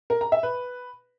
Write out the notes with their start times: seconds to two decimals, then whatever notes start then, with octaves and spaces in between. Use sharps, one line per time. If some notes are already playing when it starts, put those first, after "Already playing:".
0.10 A#4
0.21 A#5
0.32 E5
0.43 B4